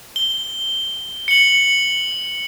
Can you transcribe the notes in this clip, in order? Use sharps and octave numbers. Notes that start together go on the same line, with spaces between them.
G7
C#7 F#7